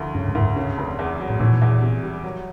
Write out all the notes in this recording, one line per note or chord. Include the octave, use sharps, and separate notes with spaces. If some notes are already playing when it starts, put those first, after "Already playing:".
Already playing: D2 F3
G2 C#3
G#2
D2
G2
C#3
F1
E2
F#3
A2
A#2 E3
E2
C3
G3
F#3